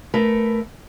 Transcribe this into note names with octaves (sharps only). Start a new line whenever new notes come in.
A3 A#4 B4